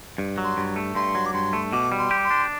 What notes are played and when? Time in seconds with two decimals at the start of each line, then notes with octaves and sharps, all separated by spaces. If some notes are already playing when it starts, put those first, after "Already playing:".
0.18 G2
0.38 F#3
0.44 C6
0.57 G2
0.76 A3
0.95 G2 C6
1.15 F#3
1.26 D6
1.33 G2 C6
1.53 A3
1.72 B2 D6
1.92 G3
1.98 C6
2.11 G4
2.24 C6
2.31 D4